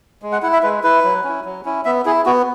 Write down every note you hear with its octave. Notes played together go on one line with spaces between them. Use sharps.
G#3
F#5
E4 F#5
E5
G#3 B4
E4 B4
F#3
C#4 E4
F#3
C#4 E4
B3 E5
E4 G#4
B3 F#4